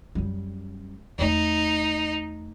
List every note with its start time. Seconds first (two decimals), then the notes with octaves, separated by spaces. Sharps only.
0.15 F#2 G3
1.19 E2 A3 D#4